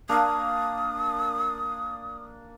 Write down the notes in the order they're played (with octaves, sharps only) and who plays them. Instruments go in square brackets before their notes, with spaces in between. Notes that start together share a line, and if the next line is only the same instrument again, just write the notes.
[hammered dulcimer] A#3 D4 A#4 [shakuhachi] D#6